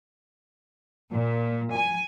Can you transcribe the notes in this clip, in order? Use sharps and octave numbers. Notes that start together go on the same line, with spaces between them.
A#2
G#5